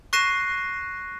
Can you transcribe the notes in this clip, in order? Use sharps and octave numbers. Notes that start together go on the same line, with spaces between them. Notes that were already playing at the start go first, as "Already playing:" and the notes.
C#6 F#6 A#6 C7 D#7 E7